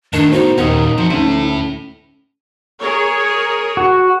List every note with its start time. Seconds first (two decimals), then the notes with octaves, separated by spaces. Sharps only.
0.13 A2 D#3 D4 A#4 D#5
0.32 B3 D#4 F#4 C5 E7
0.58 D#2 A#2 C#4 D#4 D#5 F#5 A#5 D#6
0.98 F3 C4 F#4
1.10 D2 C#4 E4 A4 D#7
2.80 G#4 A#4 C#5
3.77 F#4